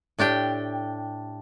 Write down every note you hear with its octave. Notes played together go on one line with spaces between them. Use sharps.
A2 D4 G4 G5